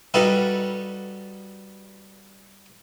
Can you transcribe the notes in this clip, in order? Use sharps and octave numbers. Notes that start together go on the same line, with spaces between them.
G3 D#4 F#4 A4 B4 F5